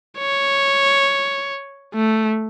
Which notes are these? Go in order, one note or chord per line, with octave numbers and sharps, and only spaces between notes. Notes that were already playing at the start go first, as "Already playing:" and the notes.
C#5
A3